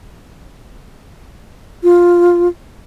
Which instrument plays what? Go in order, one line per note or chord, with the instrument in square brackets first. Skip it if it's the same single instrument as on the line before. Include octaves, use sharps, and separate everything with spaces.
[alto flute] F4